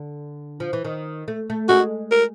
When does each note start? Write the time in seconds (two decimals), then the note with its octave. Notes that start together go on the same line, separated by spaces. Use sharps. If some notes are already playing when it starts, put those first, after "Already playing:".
Already playing: D3
0.60 F3
0.73 E3
0.85 D#3
1.28 A3
1.50 A3
1.69 G#3 F#4
2.11 A#4